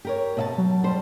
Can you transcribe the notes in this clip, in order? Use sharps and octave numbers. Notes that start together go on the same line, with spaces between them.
G4 A#4 C#5
B2 E5 A5
F#3
G3 C5